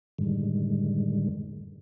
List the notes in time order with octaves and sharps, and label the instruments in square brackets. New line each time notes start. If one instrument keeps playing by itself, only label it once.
[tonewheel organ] F#2 A2 D3 D#3 G3 G#3